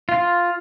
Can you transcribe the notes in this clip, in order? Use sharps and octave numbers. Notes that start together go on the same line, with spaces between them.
F4